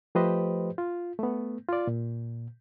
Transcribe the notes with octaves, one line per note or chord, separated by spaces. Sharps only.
F3 A3 G4 B4 C5 D#5
F4
A3 B3
F4 D5
A#2